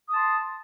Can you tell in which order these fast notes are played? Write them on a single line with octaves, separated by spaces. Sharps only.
D#6 A5 C6